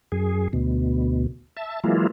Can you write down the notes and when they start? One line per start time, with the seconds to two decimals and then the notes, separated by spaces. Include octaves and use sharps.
0.12 F#2 G#4
0.53 D2 B2
1.57 E5 A5
1.84 E3 F#3 G#3 A#3 E4 F4